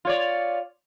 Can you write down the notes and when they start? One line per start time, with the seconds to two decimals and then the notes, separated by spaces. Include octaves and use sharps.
0.05 F4 C#5 D5